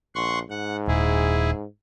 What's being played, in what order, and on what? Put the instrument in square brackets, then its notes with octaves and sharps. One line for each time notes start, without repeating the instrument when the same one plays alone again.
[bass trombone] A#1 [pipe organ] F#5 C6 C#6
[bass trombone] G#2 [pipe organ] F#5
[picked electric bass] D#1 [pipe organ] E4 G#4